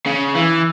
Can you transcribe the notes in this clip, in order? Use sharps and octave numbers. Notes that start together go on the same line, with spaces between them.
C#3
E3